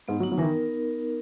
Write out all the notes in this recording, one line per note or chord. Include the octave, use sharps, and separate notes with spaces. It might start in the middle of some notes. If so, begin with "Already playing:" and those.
G#2 B3
F#3
D#4
F#3
D#3 E3 A#4